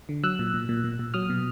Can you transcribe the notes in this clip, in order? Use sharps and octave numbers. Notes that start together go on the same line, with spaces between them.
D3
F#3 E6 F#6
A#2
A#2
A#2
A#2
A#2
F#3 D#6 F6
B2